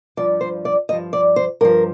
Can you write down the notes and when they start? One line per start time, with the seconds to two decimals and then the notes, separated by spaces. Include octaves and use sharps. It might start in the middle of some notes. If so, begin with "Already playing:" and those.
0.17 G2 F3 D5
0.41 C5
0.65 D5
0.89 G2 F3 D#5
1.13 D5
1.36 C5
1.61 G2 F3 A#4